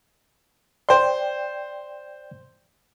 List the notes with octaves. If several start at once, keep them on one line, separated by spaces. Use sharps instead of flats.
C5 D5 G5 C6